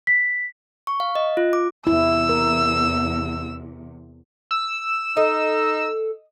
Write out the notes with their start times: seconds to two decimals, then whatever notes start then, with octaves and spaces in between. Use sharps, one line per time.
0.07 B6
0.87 C#6
1.00 F5
1.15 D#5
1.37 F4
1.53 D6
1.87 E2 C3 E4 E6
2.29 A#4
4.51 E6
5.17 D#4 A4 D#5